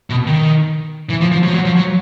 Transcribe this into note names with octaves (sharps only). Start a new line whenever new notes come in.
B2
D#3
E3
F3
F3
F#3
F3
F#3
F3
F#3